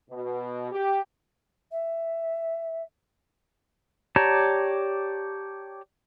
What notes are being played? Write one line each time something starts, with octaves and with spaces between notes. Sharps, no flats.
B2
G4
E5
G4 C#5 D5 A5 A#5